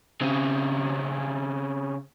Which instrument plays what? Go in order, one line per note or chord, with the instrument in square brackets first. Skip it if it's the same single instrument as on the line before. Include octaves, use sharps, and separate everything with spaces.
[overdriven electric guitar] C#3 C4